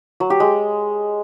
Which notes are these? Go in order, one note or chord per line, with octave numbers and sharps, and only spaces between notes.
F#3
G4
G#3